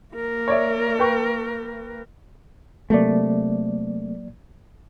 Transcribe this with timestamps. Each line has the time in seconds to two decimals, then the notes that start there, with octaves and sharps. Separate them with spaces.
0.14 A#3 A#4
0.48 C#5 D5 E5
0.99 B4 G5 C#6
2.90 C3 F#3 A3 A#3 D5